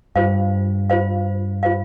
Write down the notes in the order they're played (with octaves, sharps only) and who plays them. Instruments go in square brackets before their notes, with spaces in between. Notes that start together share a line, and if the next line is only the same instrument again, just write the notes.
[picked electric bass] G2 [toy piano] F4 C5 F5
[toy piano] F4 C5 F5
F4 C5 F5